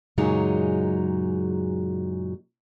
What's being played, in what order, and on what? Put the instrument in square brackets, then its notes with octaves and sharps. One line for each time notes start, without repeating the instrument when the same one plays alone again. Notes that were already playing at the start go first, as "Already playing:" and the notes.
[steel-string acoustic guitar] F#2 A#2 C#3 F#3 G#3 D#4